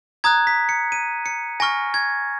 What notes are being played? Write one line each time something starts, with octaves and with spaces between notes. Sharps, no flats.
A#5 D#6 F#6 G#6
B6
C#7
D#7
C#7
G#5 C#6 F6 A#6
G#6